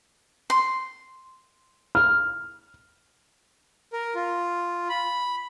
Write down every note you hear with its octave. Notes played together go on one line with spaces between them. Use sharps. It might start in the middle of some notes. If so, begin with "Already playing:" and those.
C6
F6
A#4
F4
B5